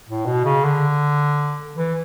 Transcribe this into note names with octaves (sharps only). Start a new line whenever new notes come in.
A2
B2
C#3
D3
E3